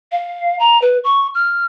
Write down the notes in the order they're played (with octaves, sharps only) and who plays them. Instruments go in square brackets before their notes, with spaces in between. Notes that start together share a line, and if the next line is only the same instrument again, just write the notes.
[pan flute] F5
A#5
B4
C#6
F6